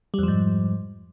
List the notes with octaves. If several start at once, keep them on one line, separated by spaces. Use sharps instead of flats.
F2 G#2 F3 G3